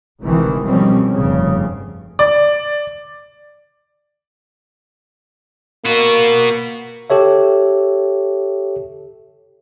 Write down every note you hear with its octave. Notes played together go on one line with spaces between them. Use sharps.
G#1 D2 C3 D#3 E3
B2 D#3 F3 G3 C4 C#4
F1 G2 C#3
D5
A#3 B3 F#4
G4 A4 C#5 E5